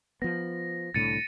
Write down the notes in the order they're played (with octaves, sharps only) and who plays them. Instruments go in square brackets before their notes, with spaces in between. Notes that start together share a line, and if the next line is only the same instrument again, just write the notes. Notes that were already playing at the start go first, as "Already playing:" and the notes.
[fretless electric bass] F3 B3 [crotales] A#6
[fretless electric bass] C2 A2 D3 [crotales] A6 C#7 D#7